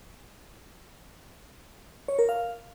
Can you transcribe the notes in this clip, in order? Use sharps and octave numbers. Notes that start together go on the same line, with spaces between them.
C#5
A#4
F5